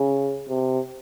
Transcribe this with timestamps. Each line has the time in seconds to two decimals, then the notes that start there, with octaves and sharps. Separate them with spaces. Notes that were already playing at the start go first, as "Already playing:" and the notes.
Already playing: C#3
0.49 C3